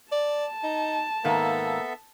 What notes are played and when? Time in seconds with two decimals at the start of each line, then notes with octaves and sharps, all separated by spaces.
0.12 D5 A5
0.64 D#4
1.25 G#2 D#3 A#3 B3 A4 E5 F5